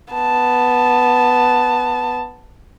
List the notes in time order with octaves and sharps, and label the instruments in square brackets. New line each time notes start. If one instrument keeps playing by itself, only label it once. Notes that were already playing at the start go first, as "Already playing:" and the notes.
[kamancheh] B3 A5